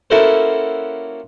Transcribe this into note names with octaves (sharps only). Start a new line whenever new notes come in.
A#3 C#4 E4 F#4 A4 C5